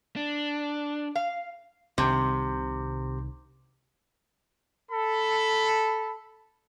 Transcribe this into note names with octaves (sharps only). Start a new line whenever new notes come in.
D4
F5
C2 C3 D#3
A4 B5